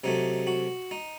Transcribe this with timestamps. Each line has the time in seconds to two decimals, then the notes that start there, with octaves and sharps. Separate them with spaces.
0.04 C3 F#3 A3 D#4
0.47 F#4
0.91 D#4